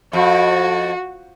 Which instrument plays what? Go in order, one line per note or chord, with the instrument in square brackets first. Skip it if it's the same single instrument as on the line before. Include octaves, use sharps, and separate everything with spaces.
[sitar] F2 [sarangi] F#4